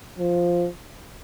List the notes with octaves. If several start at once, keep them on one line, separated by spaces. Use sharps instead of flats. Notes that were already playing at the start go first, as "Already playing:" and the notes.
F3